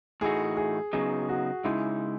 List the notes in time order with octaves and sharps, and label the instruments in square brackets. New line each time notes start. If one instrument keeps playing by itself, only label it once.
[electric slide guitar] A2 E3 A3 D#4 F#4 [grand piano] G#4
[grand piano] G#4
[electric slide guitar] F#2 C#3 F#3 B3 D#4 [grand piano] G#4
[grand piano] F#4
[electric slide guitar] C#3 G#3 D#4 [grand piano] E4